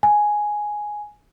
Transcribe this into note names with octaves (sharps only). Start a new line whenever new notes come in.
G#5